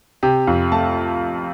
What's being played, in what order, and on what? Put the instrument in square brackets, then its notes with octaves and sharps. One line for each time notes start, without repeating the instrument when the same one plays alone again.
[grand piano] C3 G4
F2
A3 A5